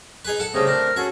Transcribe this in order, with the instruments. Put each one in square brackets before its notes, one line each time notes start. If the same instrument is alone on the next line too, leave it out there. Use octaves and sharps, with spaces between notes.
[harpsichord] D#4 G#4 B4
A4 F#5
[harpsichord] C#3 G3 [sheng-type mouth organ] A3 C4 [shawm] D#5
[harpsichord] D4 [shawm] A#4
[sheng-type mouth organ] C#4 F#4 A4 [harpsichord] G#4